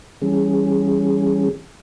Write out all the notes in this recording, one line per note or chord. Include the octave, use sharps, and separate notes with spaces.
E3 G3 C#4 G#4